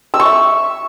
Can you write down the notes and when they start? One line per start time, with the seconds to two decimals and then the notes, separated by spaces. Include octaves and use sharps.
0.14 E6
0.20 C#6
0.25 E5